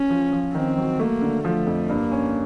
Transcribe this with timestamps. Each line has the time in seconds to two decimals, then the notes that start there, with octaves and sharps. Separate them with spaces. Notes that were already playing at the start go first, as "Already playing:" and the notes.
Already playing: C#4
0.10 F3
0.32 F3
0.55 D#3 C4
0.77 F#3
0.99 A3 A#3
1.22 D3
1.45 F3 A3
1.67 F2
1.89 G2 A#3
2.12 C#4